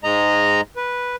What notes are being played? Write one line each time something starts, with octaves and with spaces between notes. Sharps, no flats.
G#2 G#3 D#5 A#5
B4